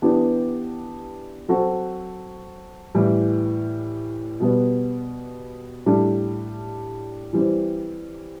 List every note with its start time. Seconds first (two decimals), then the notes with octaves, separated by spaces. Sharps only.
0.02 E3 B3 D4 G4
1.48 F#3 C4 F#4 A4
2.95 A2 E3 G3
4.40 B2 G3 B3
5.86 A2 G3 D4 A4
7.33 E3 G3 C4